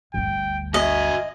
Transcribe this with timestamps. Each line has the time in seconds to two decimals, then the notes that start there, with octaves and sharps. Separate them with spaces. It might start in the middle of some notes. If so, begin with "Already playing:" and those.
0.14 G1 D2 G5
0.74 F#4 D#5 E5 G#5